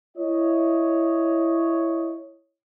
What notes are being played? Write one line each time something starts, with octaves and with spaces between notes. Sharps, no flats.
E4 C#5 D#5